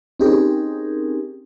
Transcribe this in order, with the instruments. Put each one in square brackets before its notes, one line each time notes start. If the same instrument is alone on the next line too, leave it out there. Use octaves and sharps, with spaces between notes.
[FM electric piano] C4 C#4 D#4 G4 G#4 A#4